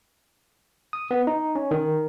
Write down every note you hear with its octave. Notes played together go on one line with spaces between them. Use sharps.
D#6
B3
D#4
C#4
D#3